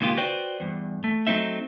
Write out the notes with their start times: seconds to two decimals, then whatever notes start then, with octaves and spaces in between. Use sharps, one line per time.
0.01 C#2 A#2 D#3 F4 G4
0.17 F#4 B4 C5 D5 G5
0.60 E2 G2
1.04 A3
1.27 F#3 A3 C4 D#4 E5